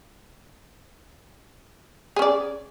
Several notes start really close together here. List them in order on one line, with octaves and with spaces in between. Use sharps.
G#4 C#4 D5